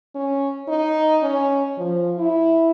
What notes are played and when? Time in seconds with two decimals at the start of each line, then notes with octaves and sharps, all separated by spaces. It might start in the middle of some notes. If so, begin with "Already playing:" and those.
0.15 C#4
0.68 D#4
1.22 C#4
1.78 F3
2.18 E4